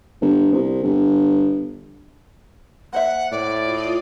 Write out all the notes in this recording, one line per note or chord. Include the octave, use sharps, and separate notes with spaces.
G1
C2
G1
A#3 C5 E5 F#5
A2 D5
F4 D6 D#6